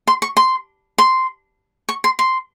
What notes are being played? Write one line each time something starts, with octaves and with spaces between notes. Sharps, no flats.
C6
C#6
C6
C6
C#6
C6
C6